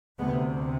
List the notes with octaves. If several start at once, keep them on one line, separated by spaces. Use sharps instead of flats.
D2 C3 G#3 B3